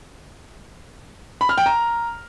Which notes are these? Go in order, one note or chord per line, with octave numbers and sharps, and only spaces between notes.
B5
F6
G5
A#5